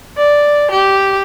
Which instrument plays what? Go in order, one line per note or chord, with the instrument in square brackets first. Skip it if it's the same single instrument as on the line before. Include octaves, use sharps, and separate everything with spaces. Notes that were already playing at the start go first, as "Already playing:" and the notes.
[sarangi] D5
G4